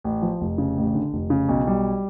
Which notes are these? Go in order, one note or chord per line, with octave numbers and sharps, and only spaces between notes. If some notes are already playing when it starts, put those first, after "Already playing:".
A1
F3
F1
C#3
A1
D3
F1
C#3
B1
G3